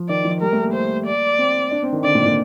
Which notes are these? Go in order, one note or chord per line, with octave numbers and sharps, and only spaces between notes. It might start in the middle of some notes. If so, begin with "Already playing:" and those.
Already playing: F3
D#3 D5
F3
G3 A#4
A3
A#3
C5
D5
C4
D4
C4
D#3
D3 D5
A#2
A#2